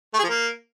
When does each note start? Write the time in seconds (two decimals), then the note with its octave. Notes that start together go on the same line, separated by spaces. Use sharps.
0.14 A3
0.19 G#4
0.24 F3
0.29 A#3